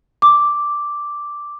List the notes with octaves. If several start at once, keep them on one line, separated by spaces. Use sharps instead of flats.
D6